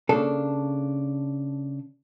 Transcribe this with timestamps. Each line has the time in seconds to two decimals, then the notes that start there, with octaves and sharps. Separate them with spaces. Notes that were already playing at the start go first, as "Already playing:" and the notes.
0.09 C#3 A#3 D4 A4